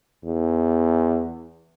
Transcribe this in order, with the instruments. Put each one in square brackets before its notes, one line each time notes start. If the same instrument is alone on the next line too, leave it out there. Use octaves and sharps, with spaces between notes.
[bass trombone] E2